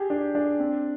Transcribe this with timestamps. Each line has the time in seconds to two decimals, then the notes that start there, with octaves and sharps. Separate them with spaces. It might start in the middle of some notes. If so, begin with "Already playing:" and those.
Already playing: G4 G#4
0.10 D4
0.35 D4
0.60 C4